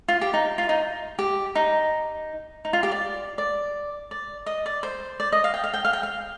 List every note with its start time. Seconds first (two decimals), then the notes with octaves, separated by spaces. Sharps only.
0.08 F4
0.21 G4
0.34 D#4
0.58 F4
0.69 D#4
1.19 G4
1.55 D#4
2.65 D#4
2.73 F4
2.83 G4
2.91 D5
3.38 D5
4.11 D5
4.46 D#5
4.66 D5
4.83 C5
5.20 D5
5.32 D#5
5.44 F5
5.54 G5
5.64 F5
5.74 G5
5.85 F5
5.93 G5
6.03 F5